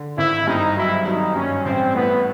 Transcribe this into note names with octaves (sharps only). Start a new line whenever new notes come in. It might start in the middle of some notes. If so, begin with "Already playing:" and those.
Already playing: D3
G#1 E4
G2 D#4
F#3 E4
F#3 D#4
G2 C#4
A1 C4
A2 B3